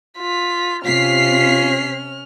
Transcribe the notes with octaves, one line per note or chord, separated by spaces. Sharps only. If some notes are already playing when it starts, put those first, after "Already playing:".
F4 B6
C3 C#4 F4 F6 B6 C7